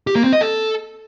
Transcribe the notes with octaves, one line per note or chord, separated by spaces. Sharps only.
G4
A#3
C4
D#5
A4